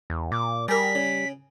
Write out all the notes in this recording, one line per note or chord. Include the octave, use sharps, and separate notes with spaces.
E2
A#2 D6
G3 G#4 A#4 B6
C#3